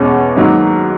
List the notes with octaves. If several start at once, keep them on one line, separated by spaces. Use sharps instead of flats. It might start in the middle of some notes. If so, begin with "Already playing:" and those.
Already playing: E2 B2 G#3 C#4
G#2 D#3 F#3 A#3